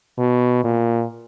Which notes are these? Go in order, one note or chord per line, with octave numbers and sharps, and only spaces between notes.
B2
A#2